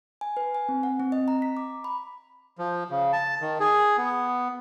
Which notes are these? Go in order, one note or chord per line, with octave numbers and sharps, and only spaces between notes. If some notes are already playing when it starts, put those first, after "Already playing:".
G#5
B4
G#5
C4
F#5
C4
D#5
A#5
B6
D6
B5
F3
C#3
A5
D#3
G#4
B3